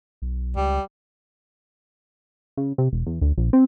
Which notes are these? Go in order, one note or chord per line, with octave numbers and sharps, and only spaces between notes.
B1
C#2 G3
C#3
C3
E1
E2
D2
A#1
C4